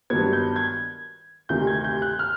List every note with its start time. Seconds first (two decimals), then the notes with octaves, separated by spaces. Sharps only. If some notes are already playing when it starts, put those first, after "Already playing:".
0.10 G2 D#3 F#3 B3 G#6
0.33 G6
0.56 G#6
1.49 D2 C3 D#3 G6
1.67 G#6
1.84 G6
2.02 F#6
2.19 F6